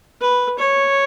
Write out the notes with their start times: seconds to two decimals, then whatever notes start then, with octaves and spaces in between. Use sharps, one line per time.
0.21 B4
0.59 C#5